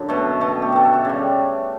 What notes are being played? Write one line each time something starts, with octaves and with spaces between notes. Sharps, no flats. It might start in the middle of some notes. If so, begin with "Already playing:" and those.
Already playing: F#2 D3
B2 A3
B2 A3
G4
B2 A3 A4
A4
F#4
C#3 G3